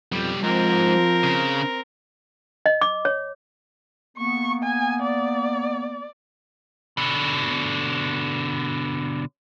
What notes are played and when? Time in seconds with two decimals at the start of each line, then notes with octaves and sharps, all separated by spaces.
0.12 B1 F2 G3
0.43 G#2 F3 C4 A#4
1.24 C#3
2.66 D#5
2.81 D6
3.05 C#5
4.17 A#3 B3 C#6
4.63 G#5
5.02 D5
6.97 B2 D3